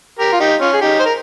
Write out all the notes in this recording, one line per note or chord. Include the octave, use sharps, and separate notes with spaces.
G4 A#4
F4
D#4 G4
C#4 F4
G#4
D#4 G4
C5
A#4